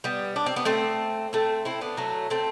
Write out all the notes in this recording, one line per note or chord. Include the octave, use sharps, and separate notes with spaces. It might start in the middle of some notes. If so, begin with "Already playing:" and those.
G3 B3
D4
C4
B3
A3 C4
A3 C4
C4 E4
B3 D4
F#3 A3
A3 C4